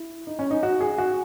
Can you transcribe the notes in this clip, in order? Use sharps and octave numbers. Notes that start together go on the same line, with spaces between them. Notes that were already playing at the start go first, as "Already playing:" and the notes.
Already playing: E4
D#4
C#4
D#4
F#4
G#4
F#4